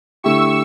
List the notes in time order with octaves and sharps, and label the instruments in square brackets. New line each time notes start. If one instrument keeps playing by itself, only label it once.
[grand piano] D3 A3 E4 G4 [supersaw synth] C#6 E6